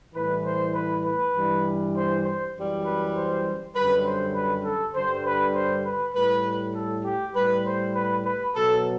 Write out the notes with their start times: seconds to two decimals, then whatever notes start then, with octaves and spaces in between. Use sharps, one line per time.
0.15 A2 E3 G3 B4
0.45 C5
0.74 B4
1.05 B4
1.35 G2 E3 G3
1.96 C5
2.25 C5
2.54 F#2 E3 G3
2.85 B4
3.15 C5
3.75 F#2 D3 G3 B4
4.06 C5
4.35 B4
4.65 A4
4.95 G2 D3 G3 C5
5.26 B4
5.55 C5
5.85 B4
6.15 A2 G3 B4
6.75 A4
7.05 G4
7.35 A2 G3 B4
7.66 C5
7.95 B4
8.25 B4
8.55 B2 F#3 A4